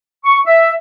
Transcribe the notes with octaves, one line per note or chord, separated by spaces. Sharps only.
C#6
E5